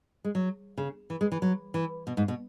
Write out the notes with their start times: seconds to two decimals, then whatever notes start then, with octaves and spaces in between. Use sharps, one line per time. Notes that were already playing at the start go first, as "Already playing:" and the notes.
0.24 G#3
0.35 F#3
0.77 C#3
1.10 E3
1.21 G#3
1.32 E3
1.42 F#3
1.74 E3
2.07 B2
2.17 G#2
2.28 B2